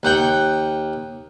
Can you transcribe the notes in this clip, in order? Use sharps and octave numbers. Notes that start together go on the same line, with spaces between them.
D#2 F#5 G5